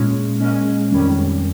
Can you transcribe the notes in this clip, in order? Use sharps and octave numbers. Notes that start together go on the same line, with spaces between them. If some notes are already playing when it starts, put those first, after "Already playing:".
Already playing: A#2 G#3 C#4
A#2 G#3 C#4
F2 D#3 G3 C#4